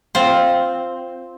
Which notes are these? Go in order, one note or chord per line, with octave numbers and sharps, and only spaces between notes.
C4 F4 C5